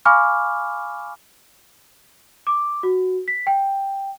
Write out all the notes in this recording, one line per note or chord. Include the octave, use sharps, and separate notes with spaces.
F5 G#5 B5 C#6 D6 F6
D6
F#4
B6
G5